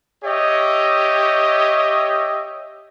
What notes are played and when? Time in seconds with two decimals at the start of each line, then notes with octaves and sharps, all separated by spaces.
0.24 G4 C#5 D#5 E5